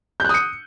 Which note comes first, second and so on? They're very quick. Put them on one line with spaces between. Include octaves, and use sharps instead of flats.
G6 F#6 D#6 C#7